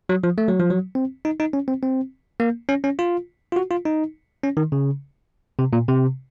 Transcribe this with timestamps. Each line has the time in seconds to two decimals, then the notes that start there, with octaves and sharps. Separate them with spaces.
0.09 F#3
0.24 F3
0.38 A3
0.48 F#3
0.59 F3
0.70 F#3
0.95 C4
1.25 D#4
1.40 D#4
1.53 C#4
1.68 C4
1.83 C4
2.40 A#3
2.69 C#4
2.84 C#4
2.99 F4
3.52 F4
3.56 F#4
3.71 F4
3.85 D#4
4.43 C#4
4.57 D#3
4.72 C#3
5.59 C3
5.73 A#2
5.88 C3